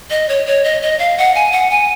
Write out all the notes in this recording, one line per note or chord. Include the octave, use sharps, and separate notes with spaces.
D#5
C#5
C#5
D#5
D#5
F5
F#5
G#5
F#5
G#5